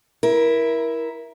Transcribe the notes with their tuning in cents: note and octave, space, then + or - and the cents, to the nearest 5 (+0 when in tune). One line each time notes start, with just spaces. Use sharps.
E4 +0 A#4 +25